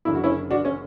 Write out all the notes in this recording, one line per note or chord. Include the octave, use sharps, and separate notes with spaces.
F#1 F#2 D3 E4
F#4
C#4 E4
D4 F#4
C#4